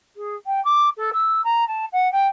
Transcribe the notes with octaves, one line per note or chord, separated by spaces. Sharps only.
G#4
G5
D6
A4
E6
A#5
A5
F#5
G5